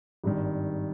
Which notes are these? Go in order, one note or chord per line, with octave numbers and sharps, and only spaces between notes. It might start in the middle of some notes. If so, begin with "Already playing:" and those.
G#1 G2 D#3